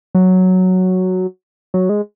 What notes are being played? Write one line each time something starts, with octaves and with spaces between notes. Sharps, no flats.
F#3
F#3
G#3